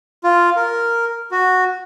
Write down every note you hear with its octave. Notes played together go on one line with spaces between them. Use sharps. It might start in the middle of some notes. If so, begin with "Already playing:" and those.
F4
A#4
F#4